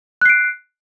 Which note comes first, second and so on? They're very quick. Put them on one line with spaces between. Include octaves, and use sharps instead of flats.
F#6 C7 D7